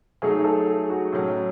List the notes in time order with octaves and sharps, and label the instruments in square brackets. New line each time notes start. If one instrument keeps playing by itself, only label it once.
[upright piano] F#3 A3 D#4 [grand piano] G#4
[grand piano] A4
G#4
F#4
[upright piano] A2 F#3 C#4